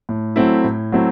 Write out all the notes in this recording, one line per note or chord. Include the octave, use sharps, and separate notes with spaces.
A2
F#3 A3 C4 E4
A2
F#3 A3 C4 E4